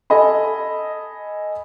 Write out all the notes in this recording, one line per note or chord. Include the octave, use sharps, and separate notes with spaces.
A4 D#5 G#5 B5